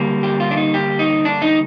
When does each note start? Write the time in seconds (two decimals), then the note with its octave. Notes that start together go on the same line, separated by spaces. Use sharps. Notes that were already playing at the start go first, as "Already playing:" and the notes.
Already playing: D3 G3 A#3
0.23 G4
0.40 F4
0.51 D4
0.57 D#4
0.74 G4
0.99 D#4
1.25 D4
1.42 D#4